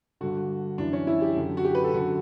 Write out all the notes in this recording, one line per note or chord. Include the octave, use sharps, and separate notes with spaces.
G2 D3 F#4
F#2 E3 D4
C#4
E4
G4
F#2 D3
F#4
G4
B4
A4
F#2 D3 F#4